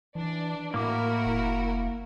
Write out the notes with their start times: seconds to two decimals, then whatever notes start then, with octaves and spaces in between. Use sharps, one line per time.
0.15 E3 D4
0.74 A2 A#3 E4 F#4 A#4 D6
1.26 F1